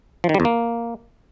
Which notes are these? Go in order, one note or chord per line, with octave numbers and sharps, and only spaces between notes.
F3
D#3
G3
E2
A#3